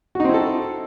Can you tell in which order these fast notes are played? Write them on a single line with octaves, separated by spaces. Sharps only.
F#4 D#4 C4 E4 A4